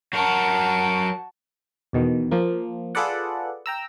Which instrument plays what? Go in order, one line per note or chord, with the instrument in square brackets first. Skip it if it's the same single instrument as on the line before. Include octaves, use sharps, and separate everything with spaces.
[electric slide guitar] F#3 A#4 [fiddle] F#4 A5
[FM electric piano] E2 B2 D#3
F3 A#3
F4 G#4 A4 B4 D5 F#5
G5 A#5 E6